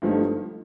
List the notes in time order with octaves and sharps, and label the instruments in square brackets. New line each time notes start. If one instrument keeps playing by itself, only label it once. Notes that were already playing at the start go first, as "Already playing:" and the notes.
[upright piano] G1 G2 F3 A3 D#4